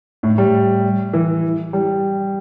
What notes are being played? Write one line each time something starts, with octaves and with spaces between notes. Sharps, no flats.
A2
G3
E3
G3